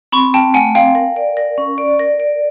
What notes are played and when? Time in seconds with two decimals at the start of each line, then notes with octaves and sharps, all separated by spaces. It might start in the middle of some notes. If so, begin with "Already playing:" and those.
0.12 C4 B5 C#6
0.34 C4 G5 A5
0.54 A3 F#5 G#5
0.75 C4 F5 G5
0.95 A#4
1.16 D5
1.37 A#4
1.58 C#4
1.78 D5
1.99 A#4
2.20 D5